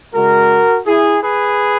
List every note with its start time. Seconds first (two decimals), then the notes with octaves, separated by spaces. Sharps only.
0.14 C#3 G#3 F#4 A#4
0.86 E4 G#4
1.22 G#4 B4